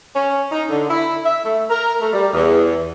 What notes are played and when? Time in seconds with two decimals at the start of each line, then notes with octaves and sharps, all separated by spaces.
0.15 C#4
0.51 D#4
0.69 D3
0.89 E4
1.24 E5
1.45 A3
1.70 A#4
2.01 A3
2.13 G3
2.33 E2